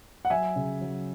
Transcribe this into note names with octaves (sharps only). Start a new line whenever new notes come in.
F#5
F#3 E5 G#5
C#3
F#3